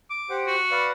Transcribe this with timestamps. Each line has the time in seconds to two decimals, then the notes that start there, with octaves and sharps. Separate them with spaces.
0.10 D6
0.30 G4 C5 F#5
0.47 F#4
0.71 B4 D5 F5